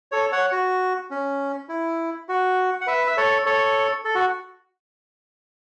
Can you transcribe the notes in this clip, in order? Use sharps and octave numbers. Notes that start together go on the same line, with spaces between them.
A4 C#5
C#5 F#5
F#4
C#4
E4
F#4
F#5
B4 E5
E5
A4 C#5
A4 C#5
A4
F#4